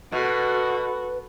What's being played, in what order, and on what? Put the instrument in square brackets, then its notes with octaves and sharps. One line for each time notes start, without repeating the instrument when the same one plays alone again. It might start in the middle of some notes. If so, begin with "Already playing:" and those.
[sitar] B2 [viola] F#4 A4 [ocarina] B4